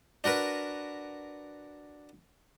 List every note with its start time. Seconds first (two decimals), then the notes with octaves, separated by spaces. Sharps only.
0.24 D4 F#4 A#4 B4